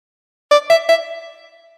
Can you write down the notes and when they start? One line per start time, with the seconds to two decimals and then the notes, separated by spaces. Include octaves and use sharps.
0.51 D5
0.70 E5
0.89 E5